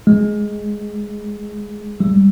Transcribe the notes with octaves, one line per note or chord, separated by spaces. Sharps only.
G#3
G3